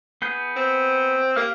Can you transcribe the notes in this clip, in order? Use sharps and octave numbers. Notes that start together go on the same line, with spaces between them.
B3 G#4 G6
C4
A#3 G4 F5 F6